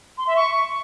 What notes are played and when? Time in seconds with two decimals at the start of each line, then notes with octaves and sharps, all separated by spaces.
0.18 C6
0.27 E5
0.36 C#6